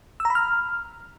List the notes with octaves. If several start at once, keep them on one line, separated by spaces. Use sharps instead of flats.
E6
A#5
B5
F6